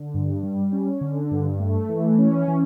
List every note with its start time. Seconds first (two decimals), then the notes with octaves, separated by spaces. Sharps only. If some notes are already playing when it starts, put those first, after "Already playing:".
Already playing: D3
0.14 G2
0.43 G3
0.72 C#4
1.01 D3
1.31 G2
1.60 A3
1.89 E3
2.18 C#4
2.48 E3